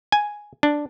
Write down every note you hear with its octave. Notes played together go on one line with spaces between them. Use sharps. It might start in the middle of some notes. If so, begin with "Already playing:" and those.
G#5
D4